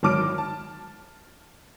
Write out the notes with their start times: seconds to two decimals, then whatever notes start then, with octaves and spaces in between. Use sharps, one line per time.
0.03 G#1 F#3 A5 D6 F6 D7
0.38 A5